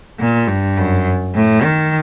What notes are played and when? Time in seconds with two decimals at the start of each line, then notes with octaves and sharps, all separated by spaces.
0.19 A#2
0.47 G2
0.77 F#2
1.35 A2
1.63 D#3